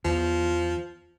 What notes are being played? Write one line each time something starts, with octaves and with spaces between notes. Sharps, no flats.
E2 F3